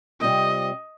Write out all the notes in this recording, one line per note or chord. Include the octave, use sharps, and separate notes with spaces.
C3 G3 C4 F4 D#5